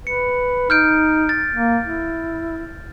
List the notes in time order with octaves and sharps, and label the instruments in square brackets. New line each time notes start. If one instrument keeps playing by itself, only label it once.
[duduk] B4 [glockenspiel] C#7
[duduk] D#4 [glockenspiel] F6 G6 D7
[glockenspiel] A6
[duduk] A#3
E4